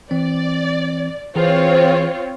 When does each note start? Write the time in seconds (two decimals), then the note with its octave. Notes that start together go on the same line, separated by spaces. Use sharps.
0.11 E3 C4 D5
1.35 E3 C4 F4 G#4 B4 C#5